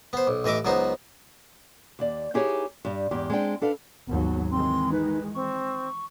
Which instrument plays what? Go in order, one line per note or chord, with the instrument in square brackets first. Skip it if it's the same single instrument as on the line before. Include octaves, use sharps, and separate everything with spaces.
[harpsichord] B3 C5
B1
A1 E3 D#5 E5 D6
C#2 F#3 B3 D#4 C5
[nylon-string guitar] D#2 D5
D#4 E4 G4 G#4 B4 C#5
G2 G3
E2 G#2 G4
G#3 C4 D4 G5
D4 A4 B4 F5
[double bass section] G#1 D#2 F#3 [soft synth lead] B3
[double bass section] D#3 E3 G#3 [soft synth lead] C4 [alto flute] C6
[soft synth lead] D#4 [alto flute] B4
[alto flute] C4 [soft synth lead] C#6